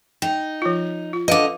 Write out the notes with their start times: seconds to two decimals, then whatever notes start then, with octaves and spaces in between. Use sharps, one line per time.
0.22 D#4 G5
0.62 F3 F4
1.13 F4
1.28 D3 B4 D#5 F5 D6